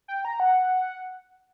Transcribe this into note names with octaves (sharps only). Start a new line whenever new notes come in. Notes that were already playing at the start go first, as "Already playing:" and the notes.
G5
A#5
F#5